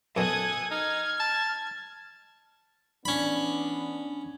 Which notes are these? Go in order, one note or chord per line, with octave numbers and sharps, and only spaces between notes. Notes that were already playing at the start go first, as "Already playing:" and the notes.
F#2 B2 A4 G#5 D#6 F#6 G#6
D#4 F6 G#6
A5
E3 B3 C#4 D4 B5